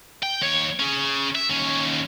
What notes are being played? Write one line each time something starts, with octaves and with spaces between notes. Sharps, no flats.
G5
D#2 C#5
C#4 G#4
E5
D#2 C#4